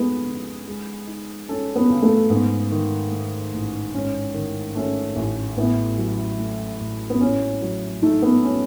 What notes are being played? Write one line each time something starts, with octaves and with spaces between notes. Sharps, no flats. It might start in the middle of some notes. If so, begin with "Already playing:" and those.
Already playing: G#3 B3 D#4 A4
C#3
G#3
D#4
C#4 A4
B3
C#3
A3
G#2 B3
D#3
A3
A1
G#2 C#4
D#3
A3 C#4
A1
A2 B3
F#3
A3
A1
B3
A2 C#4
F#3
A3 D#4
B3
C#4